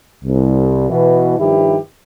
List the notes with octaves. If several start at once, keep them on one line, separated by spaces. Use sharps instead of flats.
C2
B2 E3
G2 D#3 F3 E4 G4